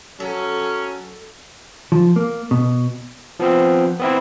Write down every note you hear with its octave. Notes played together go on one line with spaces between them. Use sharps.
F#3 C#4 A4
F3
A#3
B2
F3 B3 C4
B3 C4 E4